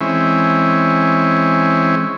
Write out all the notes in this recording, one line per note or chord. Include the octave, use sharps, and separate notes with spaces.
E3 G#3 C4 C#4 E4